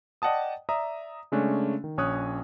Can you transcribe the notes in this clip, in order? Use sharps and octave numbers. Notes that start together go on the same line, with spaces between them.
D5 D#5 F#5 G5 A5 D#6
D5 E5 A#5 D#6
C#3 G#3 A3 C#4 D4
D#3
A#1 C#4 C#5 D#6 F#6